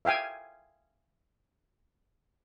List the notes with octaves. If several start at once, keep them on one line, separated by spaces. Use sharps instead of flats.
E5 F5 G5 G#5